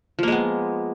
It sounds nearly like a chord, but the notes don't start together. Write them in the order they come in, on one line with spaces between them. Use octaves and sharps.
F3 A#3 G#3 B3